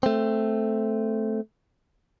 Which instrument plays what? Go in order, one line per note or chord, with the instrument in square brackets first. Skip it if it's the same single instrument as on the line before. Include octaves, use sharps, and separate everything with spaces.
[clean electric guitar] A3 C4